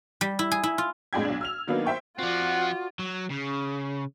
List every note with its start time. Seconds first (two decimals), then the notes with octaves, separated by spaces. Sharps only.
0.21 G3
0.39 E4
0.52 G#4
0.64 E4
0.78 F4
1.13 F2 A2 G#3 D4 G5 G#6
1.25 B1 D4
1.41 E6 F6 F7
1.67 D#3 F#3 A#3 B3 D4 D#4
1.85 C5 E5 G5 C#6
2.19 F3 C4 F4 F#4 D5 F#5
2.99 F#3
3.31 C#3